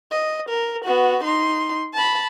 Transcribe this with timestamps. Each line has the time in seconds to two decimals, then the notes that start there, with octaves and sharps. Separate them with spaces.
0.11 D#5
0.49 A#4
0.84 B3 F#4
1.24 D#4 C6
1.94 A5 B5